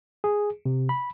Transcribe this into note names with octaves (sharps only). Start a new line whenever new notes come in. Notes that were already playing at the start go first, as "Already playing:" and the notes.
G#4
C3
B5